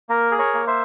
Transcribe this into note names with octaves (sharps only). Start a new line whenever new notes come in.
A#3 A#4
G#4
A#4 C#5
A#3
C5 E5